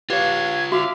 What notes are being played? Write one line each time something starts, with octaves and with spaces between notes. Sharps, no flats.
F4 G4 B4 C#5 F5 G#6
F#4 E5 F5 D6 E6